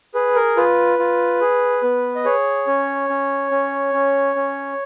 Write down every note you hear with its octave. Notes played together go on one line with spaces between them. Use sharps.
G#4 B4
A#4
F4 B4
F4
G#4
B3
D#5
G#4 C#5
C#4
C#4
C#4
C#4
C#4